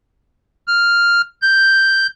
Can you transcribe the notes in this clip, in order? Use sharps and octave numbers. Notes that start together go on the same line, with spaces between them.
F6
G6